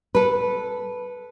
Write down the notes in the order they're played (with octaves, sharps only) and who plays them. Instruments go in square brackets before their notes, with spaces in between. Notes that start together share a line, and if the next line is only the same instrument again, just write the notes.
[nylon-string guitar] A4 B4